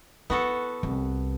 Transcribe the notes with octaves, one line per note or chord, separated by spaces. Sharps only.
B3 E4 F#4 A4
C2